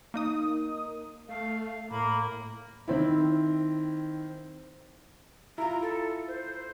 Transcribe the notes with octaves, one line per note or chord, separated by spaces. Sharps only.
A#3 D#4 D#6
A3 F5
A2 A#3 B5
D#3 C4 E4
E4 F4 A#5
A4
C5